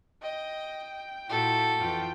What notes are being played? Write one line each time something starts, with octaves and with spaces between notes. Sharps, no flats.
D#5 G5
A#2 E4 F#4 A4
F2 E3 F4 G5